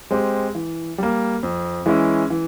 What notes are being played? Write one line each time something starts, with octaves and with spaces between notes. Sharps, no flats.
G#3 C4 G4
E3
G3 A#3
F2
E3 G#3 C#4 E4
E3